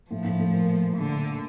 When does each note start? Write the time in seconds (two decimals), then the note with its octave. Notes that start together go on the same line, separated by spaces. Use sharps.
0.11 A2 F3 A3
0.24 A2 A3
0.39 A2 A3
0.53 A#2 A#3
0.96 D3